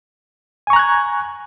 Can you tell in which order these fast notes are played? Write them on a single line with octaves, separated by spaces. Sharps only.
G#5 C#6 A#5 F#6 G#6